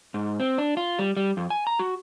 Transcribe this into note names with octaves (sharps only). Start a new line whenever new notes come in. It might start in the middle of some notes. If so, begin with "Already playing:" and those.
G#2
C4
D4
F4
G3
G3
F2
G#5
A#5
F#4